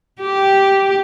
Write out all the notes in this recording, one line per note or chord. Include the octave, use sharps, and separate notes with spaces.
G4